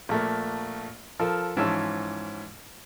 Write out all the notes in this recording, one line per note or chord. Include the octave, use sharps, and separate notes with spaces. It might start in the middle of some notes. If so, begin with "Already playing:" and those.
A#1 A3 A#3
F3 A4 A#4
G#2 E3 F3 C#4 A5 E6